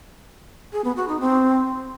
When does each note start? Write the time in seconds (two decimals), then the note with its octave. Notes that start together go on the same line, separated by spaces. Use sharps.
0.72 G#4
0.84 B3
0.96 F#4
1.08 D#4
1.20 C4